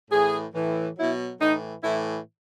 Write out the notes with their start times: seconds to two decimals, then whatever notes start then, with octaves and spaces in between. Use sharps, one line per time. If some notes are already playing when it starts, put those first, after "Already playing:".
0.11 A2 E3 G#4
0.54 A2 E3
0.97 B2 F#3 E4
1.40 A2 E3 D#4
1.83 A2 E3 E4